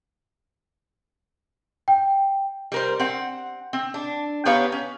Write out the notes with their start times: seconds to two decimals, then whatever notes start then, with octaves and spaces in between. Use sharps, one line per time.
1.88 G5
2.72 G3 A#4 C5
2.99 C4 F#5
3.73 C4
3.94 D4
4.45 B3 G4 B4 C#5 F5 A#5
4.72 C#4